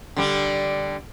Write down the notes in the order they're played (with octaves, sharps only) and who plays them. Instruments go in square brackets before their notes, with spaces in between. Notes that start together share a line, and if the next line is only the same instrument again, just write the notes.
[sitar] D3 G3 D4